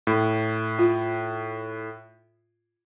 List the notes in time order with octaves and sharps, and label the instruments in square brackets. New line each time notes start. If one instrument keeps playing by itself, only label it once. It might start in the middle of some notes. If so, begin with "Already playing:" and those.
[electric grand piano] A2
[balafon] F4